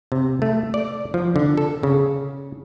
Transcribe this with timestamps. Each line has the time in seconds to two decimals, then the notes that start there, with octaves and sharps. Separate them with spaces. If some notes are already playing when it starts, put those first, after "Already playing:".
0.12 C3
0.42 A3
0.74 D5
1.14 F3
1.36 D3
1.57 A4
1.83 C#3